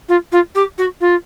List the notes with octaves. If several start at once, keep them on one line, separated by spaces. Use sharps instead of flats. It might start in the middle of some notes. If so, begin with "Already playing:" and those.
F4
F4
G4
F#4
F4